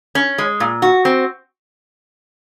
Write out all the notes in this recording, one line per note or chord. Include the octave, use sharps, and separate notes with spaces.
C#4
G#3
A#2
F#4
C4